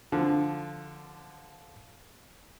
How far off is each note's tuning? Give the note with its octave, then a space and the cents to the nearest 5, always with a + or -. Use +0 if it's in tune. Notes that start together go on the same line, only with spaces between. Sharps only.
D3 +0 F3 -5